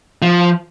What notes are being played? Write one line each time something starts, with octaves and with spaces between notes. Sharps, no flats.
F3